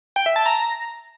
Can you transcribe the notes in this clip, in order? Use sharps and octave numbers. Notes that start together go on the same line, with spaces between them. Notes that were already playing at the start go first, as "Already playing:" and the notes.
G5
E5
A5
A#5